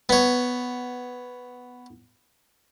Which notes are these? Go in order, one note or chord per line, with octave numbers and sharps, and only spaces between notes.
B3 C#5